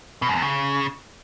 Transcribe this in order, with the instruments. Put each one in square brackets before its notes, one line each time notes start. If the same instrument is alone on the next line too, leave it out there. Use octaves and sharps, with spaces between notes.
[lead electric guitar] B2
F#2
E2
C#3